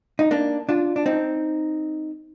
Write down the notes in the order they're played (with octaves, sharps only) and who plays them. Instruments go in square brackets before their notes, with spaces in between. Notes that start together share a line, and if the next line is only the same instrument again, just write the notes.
[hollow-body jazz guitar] D#4
A#3 D4
D4 F4
D4
C4 D#4